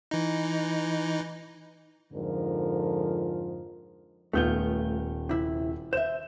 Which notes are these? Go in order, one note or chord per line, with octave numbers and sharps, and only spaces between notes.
E3 D#4
F2 G#2 D3 F3 A#4
D#1 A3 B3 F4 G6 G7
C3 E4
C5 E5 E7